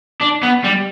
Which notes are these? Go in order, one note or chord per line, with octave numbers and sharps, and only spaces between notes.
D4
B3
G3